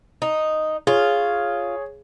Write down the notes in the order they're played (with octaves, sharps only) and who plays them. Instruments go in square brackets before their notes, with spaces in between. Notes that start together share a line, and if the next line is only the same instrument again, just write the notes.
[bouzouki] D#4
[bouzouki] F4 [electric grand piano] G#4 C#5